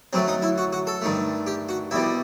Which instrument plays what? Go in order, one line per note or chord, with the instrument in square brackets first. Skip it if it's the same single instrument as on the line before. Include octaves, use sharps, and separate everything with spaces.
[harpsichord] F#2 F#3 A3 C4
D#4
E4
F#4
F#4
A4
G2 D#3 A3
G4
F#4
C2 B2 G3 E4